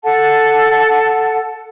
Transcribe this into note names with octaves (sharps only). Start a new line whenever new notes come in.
A4 F#5 A5